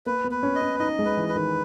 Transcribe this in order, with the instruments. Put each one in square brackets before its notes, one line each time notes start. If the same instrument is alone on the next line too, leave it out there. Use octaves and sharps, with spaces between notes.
[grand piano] A#3 [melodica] B4
[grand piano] B3
[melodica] B4
[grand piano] C#4
[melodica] D#5
[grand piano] C#4
[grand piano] D#4 [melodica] D#5
[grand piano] G#3
[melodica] B4
[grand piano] E3
[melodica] B4
[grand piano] D#3